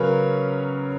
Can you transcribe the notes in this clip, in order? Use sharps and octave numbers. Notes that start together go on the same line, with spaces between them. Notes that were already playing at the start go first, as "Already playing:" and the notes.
Already playing: C#3 F#3 C#4 A#4 B4 C#5